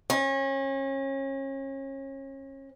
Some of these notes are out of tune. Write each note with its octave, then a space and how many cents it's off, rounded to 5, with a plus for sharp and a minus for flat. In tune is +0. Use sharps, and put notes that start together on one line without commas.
C#4 -30